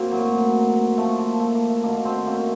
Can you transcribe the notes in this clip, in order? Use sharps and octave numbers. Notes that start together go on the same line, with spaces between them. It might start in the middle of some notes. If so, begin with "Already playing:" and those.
Already playing: F#2 A#3 C4 F#4
A2 F#3
A#2 F3 A3
A#3
A3
A#3
A3
F#2 D#3 F#3 A#3
A3 C4
C4
A#3 C#4